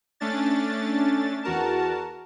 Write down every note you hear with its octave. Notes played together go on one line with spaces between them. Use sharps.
A3 C#4 D4 A6
E2 F#4 A#4 A5